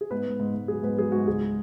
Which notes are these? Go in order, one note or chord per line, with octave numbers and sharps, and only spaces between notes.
G#4
G#2 B3 B4
G#2
G#2
G#2
F#3 G#4
G#2 B3 B4
F#3 G#4
G#2 F#4
C#2 G#4